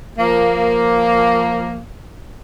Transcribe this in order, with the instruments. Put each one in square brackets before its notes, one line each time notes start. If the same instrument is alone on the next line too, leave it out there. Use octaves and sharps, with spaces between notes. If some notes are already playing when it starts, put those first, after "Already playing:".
[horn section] F3 A#3